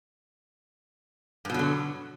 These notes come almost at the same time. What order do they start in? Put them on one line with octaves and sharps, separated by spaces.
G2 B2 F#3 D3